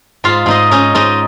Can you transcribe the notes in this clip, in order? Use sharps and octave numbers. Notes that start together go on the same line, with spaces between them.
G#2 F4 F5
G#2 D#4 D#5
C#4 D#4 D#5
G#2 D#4 D#5